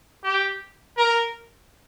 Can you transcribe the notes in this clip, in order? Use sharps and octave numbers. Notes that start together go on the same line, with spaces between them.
G4
A#4